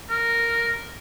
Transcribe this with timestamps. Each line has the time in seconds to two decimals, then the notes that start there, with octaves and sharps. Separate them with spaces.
0.10 A#4